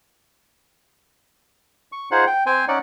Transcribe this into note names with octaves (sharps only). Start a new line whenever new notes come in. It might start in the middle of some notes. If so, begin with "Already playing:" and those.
C#6
D#4 F4 G#4 C5 F#5
G5
C4 C5 G5 G#5
C#4 D#4 D5 F#5